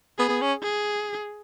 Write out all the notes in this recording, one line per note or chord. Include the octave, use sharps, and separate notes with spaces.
B3 G#4
B3
C#4
G#4